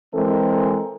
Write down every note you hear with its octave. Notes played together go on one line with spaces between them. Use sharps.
E3 G#3 C4 A4 A#4